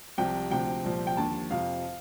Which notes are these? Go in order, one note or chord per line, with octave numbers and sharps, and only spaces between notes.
C2 C3 F3 G5
D2 C3 F3 G5
C2 A#2 F3
G5
D#2 D3 F3 A5
F2 C3 F3 F5